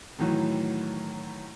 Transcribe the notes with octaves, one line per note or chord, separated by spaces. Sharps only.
A2 D#3 E3 F#3